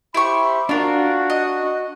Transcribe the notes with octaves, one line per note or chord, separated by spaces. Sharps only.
E4 G4 C5 B5 C#6
D4 F4 F#4 A#4
D#5